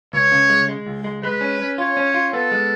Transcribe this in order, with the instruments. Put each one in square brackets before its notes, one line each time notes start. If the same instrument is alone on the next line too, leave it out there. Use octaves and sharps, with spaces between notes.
[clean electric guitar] C#2 [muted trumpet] C#5
[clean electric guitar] C#3
G#3
G#3
C#2
G#3
[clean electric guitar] G#3 [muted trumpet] B4
[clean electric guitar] C#4
C#4
[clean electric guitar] F4 [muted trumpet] C#5
[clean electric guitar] C#4
F4
[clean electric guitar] B3 [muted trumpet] A4
[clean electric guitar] G#3